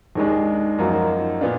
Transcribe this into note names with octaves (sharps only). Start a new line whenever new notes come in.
D#2 D#3 G#3 D4
F#2 F3 A#3 D#4 F#4
A#2 B3 D4 F4